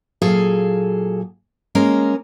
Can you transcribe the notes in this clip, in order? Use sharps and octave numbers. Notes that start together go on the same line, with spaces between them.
A#2 F#3 G#4 A4 F5
G#3 A#3 C#4 A#4